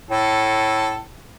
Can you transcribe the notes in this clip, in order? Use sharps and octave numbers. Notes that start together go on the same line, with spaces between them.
A2 A4